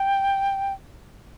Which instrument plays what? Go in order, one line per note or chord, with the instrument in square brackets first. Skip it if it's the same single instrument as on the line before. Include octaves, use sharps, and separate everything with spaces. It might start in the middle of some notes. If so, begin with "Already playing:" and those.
Already playing: [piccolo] G5